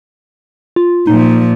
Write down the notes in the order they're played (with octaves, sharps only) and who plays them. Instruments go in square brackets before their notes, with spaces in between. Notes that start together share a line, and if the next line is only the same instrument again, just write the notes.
[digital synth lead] F4
[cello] A#2 F3 [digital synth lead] D#4